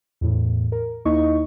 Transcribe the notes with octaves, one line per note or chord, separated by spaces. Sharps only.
E2 A2
A#4
D#2 A#3 D#4 E4 D#5 C#6